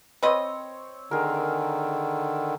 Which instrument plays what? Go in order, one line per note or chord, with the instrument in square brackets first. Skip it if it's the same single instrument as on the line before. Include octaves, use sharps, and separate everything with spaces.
[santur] C4 C#5 [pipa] B4 D#5
[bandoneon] D3 D#3 [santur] G#4 A#4